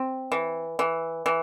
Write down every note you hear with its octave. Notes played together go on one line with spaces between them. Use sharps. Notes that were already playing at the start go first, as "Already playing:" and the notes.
Already playing: C4
E3
E3
E3